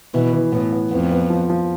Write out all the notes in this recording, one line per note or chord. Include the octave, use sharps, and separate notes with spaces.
B2 E3
E3
A2 B3
B3
F2 B3
B3
F3
F3